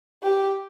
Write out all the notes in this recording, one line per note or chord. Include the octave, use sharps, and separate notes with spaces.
G4